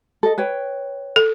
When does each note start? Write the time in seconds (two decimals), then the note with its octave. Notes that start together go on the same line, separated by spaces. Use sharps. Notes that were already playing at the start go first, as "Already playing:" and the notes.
0.23 A4 D#5
0.38 B4 C#5 G5
1.16 A4